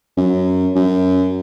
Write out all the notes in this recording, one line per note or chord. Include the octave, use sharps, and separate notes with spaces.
F#2
F#2